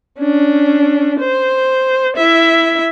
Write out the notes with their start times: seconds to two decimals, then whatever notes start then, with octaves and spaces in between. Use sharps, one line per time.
0.19 C#4 D4
1.19 C5
2.16 E4 E5